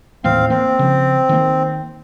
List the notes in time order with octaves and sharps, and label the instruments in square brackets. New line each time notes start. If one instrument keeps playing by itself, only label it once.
[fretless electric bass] D#2 A2 E3 [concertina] C4 F5
[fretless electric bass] A#3 [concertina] C4
[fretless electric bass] C#3 F3
D#3 A#3